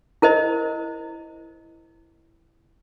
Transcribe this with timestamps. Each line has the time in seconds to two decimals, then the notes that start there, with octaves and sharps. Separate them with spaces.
0.22 E4 A#4 C5 D#5